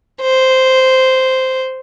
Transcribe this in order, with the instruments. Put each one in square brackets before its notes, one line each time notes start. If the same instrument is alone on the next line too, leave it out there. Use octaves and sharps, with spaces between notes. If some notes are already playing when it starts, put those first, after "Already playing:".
[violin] C5